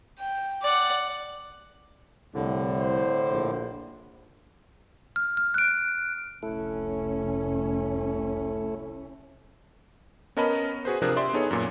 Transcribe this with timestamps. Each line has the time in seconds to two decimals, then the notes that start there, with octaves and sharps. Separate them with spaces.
0.19 G5
0.62 D5 F#5
2.34 C2 A2 D3
2.80 C5
3.30 A#1
5.16 F6
5.37 F6
5.54 F#6 D7
6.43 F1 C2 A3 C#4 E4 A4
10.37 B3 C#4 A#4 D#5 A5 B5
10.85 F#4 G#4 B4 C5
11.02 C3 F3 D4 G#4 A#4 F#6
11.16 G4 D5 E5 C6
11.33 B3 D#4 G#4 A4 C#5
11.51 F#2 A#2